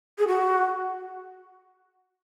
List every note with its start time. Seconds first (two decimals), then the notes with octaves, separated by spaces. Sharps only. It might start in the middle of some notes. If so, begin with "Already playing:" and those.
0.18 G#4
0.27 F#4